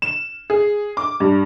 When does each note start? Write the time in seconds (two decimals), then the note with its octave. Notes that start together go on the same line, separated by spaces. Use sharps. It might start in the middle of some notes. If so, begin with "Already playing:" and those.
0.02 E7
0.50 G#4
0.97 D6
1.20 G2